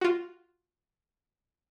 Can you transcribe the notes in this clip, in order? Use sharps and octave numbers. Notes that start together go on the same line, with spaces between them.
F4 F#4